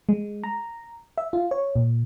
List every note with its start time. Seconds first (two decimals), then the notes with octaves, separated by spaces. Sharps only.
0.09 G#3
0.44 A#5
1.18 E5
1.33 F4
1.51 C#5
1.76 A#2